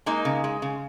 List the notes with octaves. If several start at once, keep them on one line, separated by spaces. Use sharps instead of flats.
G#3 A#3 D#4
C#3
G#3
C#3